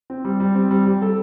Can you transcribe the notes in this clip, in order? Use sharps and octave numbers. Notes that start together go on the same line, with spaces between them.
C4
G3
G3
C4
G3
G3
A4